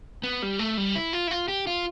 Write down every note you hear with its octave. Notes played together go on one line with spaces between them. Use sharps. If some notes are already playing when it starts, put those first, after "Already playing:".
B3
G3
A3
G3
E4
F4
E4
F4
G4
F4